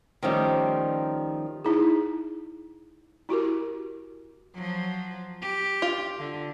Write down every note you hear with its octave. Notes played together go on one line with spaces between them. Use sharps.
D#3 F3 G3 A3 C#4 G4
D#4 E4 G#4
E4 F#4 G4 A#4
F3 F#3
G4
F4
D3